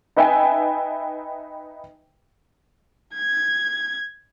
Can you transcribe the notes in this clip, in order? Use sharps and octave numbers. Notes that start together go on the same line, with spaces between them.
D#4 B4 E5 G5 G#5
G#6